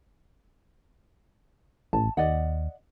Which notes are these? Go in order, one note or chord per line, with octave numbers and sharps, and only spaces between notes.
A1 A5
D#2 D5 D#5 F#5